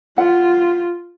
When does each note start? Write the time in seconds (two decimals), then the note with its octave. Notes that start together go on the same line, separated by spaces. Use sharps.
0.18 F4 F#5